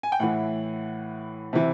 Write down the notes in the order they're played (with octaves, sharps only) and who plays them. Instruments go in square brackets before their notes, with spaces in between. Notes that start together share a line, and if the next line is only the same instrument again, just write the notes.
[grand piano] G#5
G5
A2 E3 F#5
C3 E3